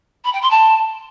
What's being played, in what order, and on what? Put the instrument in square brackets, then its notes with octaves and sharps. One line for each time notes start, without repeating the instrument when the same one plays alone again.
[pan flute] B5
G5
C6
A5